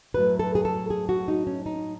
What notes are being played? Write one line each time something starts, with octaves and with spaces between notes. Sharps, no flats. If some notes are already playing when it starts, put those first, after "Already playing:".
A2 F#3 A3 B4
A4
G#4
A4
G#4
F#4
D#4
C#4
D#4